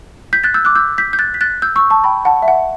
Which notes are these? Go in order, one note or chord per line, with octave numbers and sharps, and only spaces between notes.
G6 B6
F#6 A6
E6 G6
D6 F#6
E6 G6
G6 B6
G6
F#6 A6
B6
F#6 A6
E6 G6
C#6 E6
A5 C#6
G5 B5
F#5 A5
E5
F#5